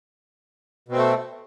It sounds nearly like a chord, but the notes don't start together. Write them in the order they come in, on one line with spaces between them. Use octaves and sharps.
B2 C4 A3